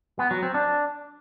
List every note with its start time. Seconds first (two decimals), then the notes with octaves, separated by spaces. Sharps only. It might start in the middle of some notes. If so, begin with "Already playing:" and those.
0.19 B3
0.31 F#3
0.43 C4
0.54 D4